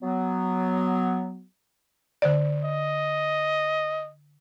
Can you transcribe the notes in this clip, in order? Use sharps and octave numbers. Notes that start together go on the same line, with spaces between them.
F#3 B3
D3 C5 D5
D#5